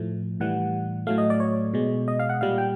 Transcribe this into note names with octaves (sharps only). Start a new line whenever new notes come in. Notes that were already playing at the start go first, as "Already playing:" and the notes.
Already playing: A2 F3 A3
A2 E3 G3 F#5
A2 F#3 A3 F5
D#5
D5
C#5
B2 G#3
D#5
F5
F#5
A#2 G3 F5
G5